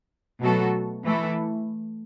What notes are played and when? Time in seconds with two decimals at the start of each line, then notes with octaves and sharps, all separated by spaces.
0.40 B2 F#3 A3 F#4 A4
1.04 E3 A3 E4 A4